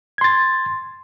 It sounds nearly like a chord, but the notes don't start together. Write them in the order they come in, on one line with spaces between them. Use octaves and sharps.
G#6 C6 A6